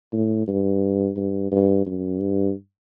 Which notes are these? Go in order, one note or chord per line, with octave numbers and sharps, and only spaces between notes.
A2
G2
G2
G2
F#2
G2